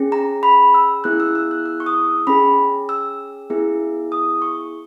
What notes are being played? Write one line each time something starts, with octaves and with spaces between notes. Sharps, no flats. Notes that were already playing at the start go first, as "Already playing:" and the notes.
Already playing: C#4 G#4
A#5
B5
E6
B3 E4 G#4 F#6
E6
E6
F#6
E6
C#6
D#6
C#4 G#4 B5
E6
B3 E4 G#4
D#6
C#6